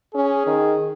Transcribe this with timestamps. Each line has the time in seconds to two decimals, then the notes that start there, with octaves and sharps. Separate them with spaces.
0.15 C#4 G#4
0.46 D#3